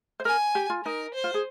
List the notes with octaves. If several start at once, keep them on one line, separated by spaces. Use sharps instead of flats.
C5
A#4 G#5
G4
F4
D#4 A#4
C5
F4
G#4